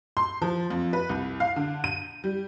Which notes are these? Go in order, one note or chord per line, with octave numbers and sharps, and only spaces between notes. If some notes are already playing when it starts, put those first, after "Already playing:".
C6
F3
F2
B4
C2
F5
D3
D#7
G3